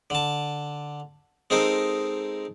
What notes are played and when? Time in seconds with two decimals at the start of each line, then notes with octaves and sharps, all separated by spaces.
0.10 D3 A5
1.50 G#3 C4 D#4 A4 A#4